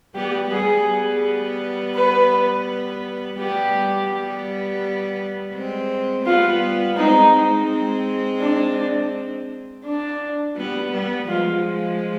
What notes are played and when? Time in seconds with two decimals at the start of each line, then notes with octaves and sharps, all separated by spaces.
0.15 G3 B3 G4
0.51 G3 B3 G#4
1.95 B4
3.38 G3 B3 G4
4.10 G3 B3
5.53 G#3 C4
6.25 G3 B3 F4
6.97 G#3 C4 D#4
7.33 G#3 C4
8.41 D4
9.84 D4
10.56 G3 B3
10.92 G3 B3
11.28 F3 G#3 F4